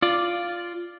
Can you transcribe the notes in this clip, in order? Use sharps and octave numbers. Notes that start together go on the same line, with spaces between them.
F4 D5